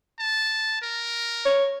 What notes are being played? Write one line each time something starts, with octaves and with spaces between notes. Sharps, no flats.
A5
A#4
C#5